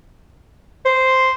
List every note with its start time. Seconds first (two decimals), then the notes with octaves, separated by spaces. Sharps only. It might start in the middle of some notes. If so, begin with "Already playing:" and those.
0.86 C5